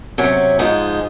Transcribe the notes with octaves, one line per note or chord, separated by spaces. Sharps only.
C3 F#3 C#4
G#2 F3 G#3 D#4